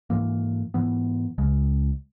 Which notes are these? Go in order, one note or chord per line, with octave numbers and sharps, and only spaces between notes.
G#2 E3 A#3
G#2 E3 B3
C#2 C#3 G#3